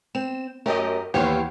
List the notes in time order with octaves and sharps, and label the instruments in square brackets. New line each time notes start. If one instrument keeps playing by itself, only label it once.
[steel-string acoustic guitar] C4 [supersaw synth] E7
[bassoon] F#2 [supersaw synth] A3 G4 D#5 [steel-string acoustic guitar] A#4
[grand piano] D#2 E3 [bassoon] B3 [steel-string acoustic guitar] G4 [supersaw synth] C5 C#5 F5